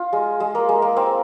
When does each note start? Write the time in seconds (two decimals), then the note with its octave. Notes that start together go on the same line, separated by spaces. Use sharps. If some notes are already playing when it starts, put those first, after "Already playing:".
Already playing: F4
0.13 G#3
0.40 G#3
0.55 A#3
0.69 G#3
0.82 A#3
0.97 C4